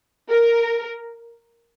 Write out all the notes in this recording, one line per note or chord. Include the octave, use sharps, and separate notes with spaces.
A#4